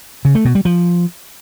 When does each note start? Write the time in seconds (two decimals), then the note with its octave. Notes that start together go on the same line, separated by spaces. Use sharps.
0.25 C#3
0.35 A3
0.45 B2
0.55 G3
0.65 F3